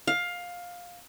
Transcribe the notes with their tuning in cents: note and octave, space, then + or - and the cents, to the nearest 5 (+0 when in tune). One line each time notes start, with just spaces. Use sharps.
F5 +15